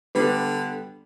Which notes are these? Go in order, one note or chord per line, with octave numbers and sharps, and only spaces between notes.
D3 G3 B3